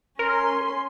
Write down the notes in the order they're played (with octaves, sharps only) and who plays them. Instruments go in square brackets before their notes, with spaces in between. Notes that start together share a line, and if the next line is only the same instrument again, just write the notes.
[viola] C#4 C6 [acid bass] A#4